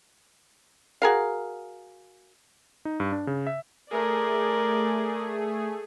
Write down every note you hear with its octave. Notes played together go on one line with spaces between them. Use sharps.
F#4 G#4 A#4 F5
D#4
G2
D4
C#3
E5
A3 G#4 A#4 D5